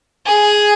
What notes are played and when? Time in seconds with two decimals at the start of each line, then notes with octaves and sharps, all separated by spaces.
0.26 G#4